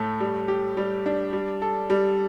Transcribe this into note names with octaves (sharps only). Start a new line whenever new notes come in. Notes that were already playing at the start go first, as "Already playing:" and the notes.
Already playing: A2 A3
G3
G4
G3
D4
G3
A4
G3